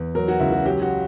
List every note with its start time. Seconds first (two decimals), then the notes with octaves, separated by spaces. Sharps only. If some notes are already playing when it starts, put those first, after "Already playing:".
Already playing: E2
0.15 F#3 A#4
0.28 F#4
0.40 C#2 E4
0.52 F#4
0.65 F#3 G4
0.82 F#4